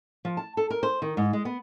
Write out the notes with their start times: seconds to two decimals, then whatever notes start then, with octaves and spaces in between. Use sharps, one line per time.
0.25 F3
0.37 A5
0.57 A4
0.70 A#4
0.83 C5
1.02 D#3
1.17 G#2
1.33 G#3
1.45 B3